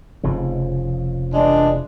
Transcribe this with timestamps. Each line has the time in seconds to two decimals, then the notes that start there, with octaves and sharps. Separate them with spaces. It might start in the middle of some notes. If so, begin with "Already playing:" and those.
0.23 F1 C#3 F3
1.33 E3 G#3 D4